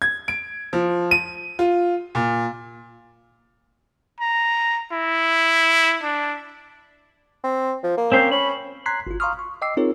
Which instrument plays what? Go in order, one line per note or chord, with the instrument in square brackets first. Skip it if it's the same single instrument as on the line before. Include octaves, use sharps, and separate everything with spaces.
[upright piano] G#6
D7
F3
D#7
F4
A#2
[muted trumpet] A#5
E4
D4
[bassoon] C4
F3
A#3
[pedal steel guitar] C4 C#4 C5
[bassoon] C#4 [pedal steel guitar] B5
[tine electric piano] A#5 C6 F#6 G#6 B6 C7
G1 F4
F5 A#5 C6 C#6 D#6 F6
C#6
D#5 G5 D6 E6 C7
C4 D#4 F4 G#4 A#4 C#5